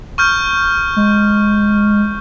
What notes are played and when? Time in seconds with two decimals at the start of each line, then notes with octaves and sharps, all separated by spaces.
0.18 C#6 F6 G6
0.96 G#3